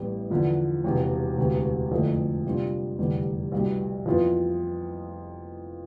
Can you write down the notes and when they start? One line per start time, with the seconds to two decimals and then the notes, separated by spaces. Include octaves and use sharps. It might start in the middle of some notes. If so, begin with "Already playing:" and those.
Already playing: A1 A2 G3 B3
0.31 E2 D3 F3
0.84 E1 E2 C3
1.38 E1 D2 C3 E3
1.91 F2 D3 A3 E4
2.45 C3 G3 D4 F4
2.99 F1 E2 D3 G3
3.52 C2 B2 G3
4.06 F2 E3 B3 F4